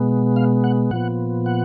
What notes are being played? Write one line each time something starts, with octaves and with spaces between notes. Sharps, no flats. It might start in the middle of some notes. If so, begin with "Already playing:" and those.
Already playing: B2 G#3 B3
F5
F#5
A#2 F3 B3 F#5
F#5